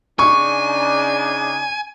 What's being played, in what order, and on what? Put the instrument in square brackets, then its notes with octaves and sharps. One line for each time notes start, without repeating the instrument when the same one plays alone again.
[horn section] C#3 D4 D#4 [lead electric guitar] G#5 [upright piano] C#6